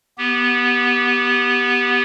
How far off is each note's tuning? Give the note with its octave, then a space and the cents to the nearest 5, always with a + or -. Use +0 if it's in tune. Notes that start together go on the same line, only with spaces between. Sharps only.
B3 -15 G4 +0